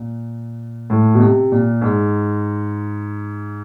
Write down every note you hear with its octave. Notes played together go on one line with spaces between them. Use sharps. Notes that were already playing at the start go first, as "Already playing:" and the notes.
Already playing: A#2
A2
B2
C3
A#2
G#2